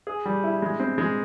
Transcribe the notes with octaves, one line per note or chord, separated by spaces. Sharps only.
G#4
G3
E4
G#3
C4
G#3